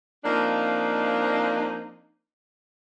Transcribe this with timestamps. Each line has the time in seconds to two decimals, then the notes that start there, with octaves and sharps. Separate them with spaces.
0.25 F3 A#3 C4 D4 D#4 D#5